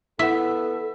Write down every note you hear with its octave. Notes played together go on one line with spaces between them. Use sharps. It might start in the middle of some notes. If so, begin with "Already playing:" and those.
B3 E4 A4 E5 F#5